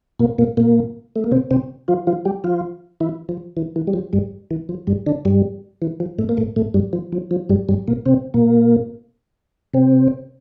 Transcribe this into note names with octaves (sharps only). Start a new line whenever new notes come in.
A#2 A#3
A#2 A#3
A#2 A#3
A3
A#3
C3 C4
C3 C4
F3 F4
F3 F4
G3 G4
F3 F4
E3 E4
F3
E3
E3
G3
F3
G2 G3
E3
F3
G2 G3
D3 D4
G2 G3
E3
F3
A2 A3
A#3
A2 A3
A2 A3
G2 G3
F3
F3
F3
G2 G3
G2 G3
A#2 A#3
C3 C4
A#2 A#3
C3 C4